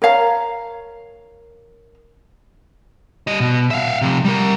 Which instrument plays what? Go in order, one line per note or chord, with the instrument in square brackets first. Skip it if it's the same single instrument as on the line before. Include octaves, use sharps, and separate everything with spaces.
[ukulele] A#4 C#5 F5 A#5
[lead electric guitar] G3 D#5
B2
E5 F5
C3 F3
G3 A#4